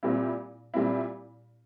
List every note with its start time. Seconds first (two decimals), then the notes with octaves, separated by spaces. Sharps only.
0.03 A#2 G3 C4 E4
0.74 A#2 G3 C4 E4